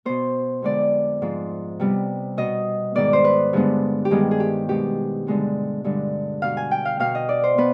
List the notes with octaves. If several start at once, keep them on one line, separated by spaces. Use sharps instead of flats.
B2 B3 C5
F2 D3 G#3 B3 D5
G#2 F3 G#3
C3 G3 B3
B2 B3 D#5
G#2 D#3 B3 D5
C5
B4
G2 D3 G#3 B3
G4
G2 D#3 G#3 B3 G#4
G#4
G4
B2 G#3 B3 G4
G2 D3 G#3 B3
G2 D3 G#3
B2 B3 F5
G#5
G5
F5
B2 B3 F5
D#5
D5
C5
B3 B4